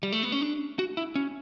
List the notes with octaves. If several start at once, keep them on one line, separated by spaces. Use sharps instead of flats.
G3
A3
B3
C#4
D4
F#4
E4
C#4